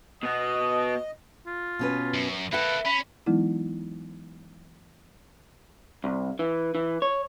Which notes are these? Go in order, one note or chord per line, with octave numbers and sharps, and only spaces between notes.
B2 B3 D#5 D#6
F4
B2 C#4 B4
F#2
A#3 A4 B4 E5 F#5
C#4 B5
E3 F#3 G#3 B3 D#4 E4
C2
E3
E3
C#5